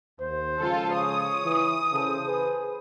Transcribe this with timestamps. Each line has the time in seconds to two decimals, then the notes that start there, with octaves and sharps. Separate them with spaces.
0.21 D#2 C5
0.59 C#3 F3 G#3 F4 A4
0.96 C#5 D#6
1.44 E3
1.93 C#3 E3 A4 C5
2.27 G#4 B4